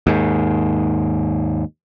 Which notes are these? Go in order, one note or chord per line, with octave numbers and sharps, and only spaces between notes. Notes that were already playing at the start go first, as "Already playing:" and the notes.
D#2 G#2